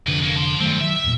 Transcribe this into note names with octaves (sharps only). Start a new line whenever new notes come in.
F1 F2 D3 B4
A#3 C#4
A5 C6
G2 D#3 F#3 A3 C4
D#3 F#3 E5
E1 A#2